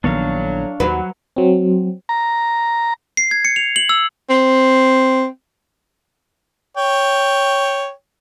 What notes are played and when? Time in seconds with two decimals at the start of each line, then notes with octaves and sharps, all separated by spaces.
0.04 A#1 A2 D#3 F#3 B3 D4 C#5 F5
0.80 D#2 F#3 B4
1.36 F#3 C4
2.09 A#5
3.17 C7
3.31 G#6
3.45 C#7
3.56 F7
3.76 F#7
3.89 E6
4.30 C4
6.77 C#5 G5